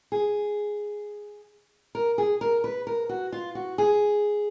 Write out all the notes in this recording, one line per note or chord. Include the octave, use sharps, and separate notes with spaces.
G#4
A#4
G#4
A#4
B4
A#4
F#4
F4
F#4
G#4